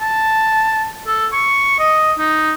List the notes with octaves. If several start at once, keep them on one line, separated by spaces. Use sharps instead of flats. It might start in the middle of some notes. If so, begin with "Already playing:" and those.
A5
A4
C#6
D#5
D#4